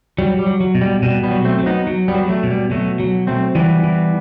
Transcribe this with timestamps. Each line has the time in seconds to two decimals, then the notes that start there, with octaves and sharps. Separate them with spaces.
0.18 F#3 G3
0.39 G3
0.47 F#3
0.61 F#3
0.75 B2
0.81 G3
1.03 B2 G3
1.23 G3 B3
1.31 F#3
1.45 A3 C4
1.59 F#3
1.66 B3 D#4
1.87 F#3
2.08 G3 B3
2.15 F#3
2.29 F#3 A3
2.43 B2
2.50 G3
2.71 B2 F#3 A3
3.00 F#3
3.27 F#3 A3 C4
3.55 E3 G3 B3
3.84 E3